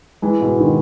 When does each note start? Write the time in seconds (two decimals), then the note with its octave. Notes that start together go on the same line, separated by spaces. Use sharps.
0.22 E3 G#3
0.41 G#2 B2
0.59 B2 D#3